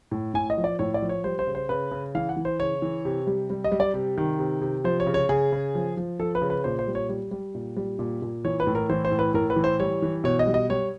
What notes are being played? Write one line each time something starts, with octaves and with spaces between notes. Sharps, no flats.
A2
A2 G#5
D#5
F3
D5
A2 C#5
D5
F3
C#5
G3 C5
C5
C#3
C5
C#3 B4
C#3
E3 F5
F#5
E3
C5
C#3 C#5
E3
C3
G3
G3
D#5
G3
D5
C3
D#3
C3
C3
F3 C5
C#5
C#3
C#5
C#3 G#4
C#3
F3
F3
F3 A4
B4
C#3
B4
A#2 C5
C5
G3
C#5
G3
G3
A#2
G3
A#2
A#2
E3 C#5
B4
A2
A#4
E3 C5
C5
A2
B4
A2 A#4
B4
E3
C5
G3 C#5
E3
B2 C#5
D#5
G3
D#5
G3 C#5